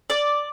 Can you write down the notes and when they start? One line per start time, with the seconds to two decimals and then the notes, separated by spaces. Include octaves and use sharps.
0.10 D5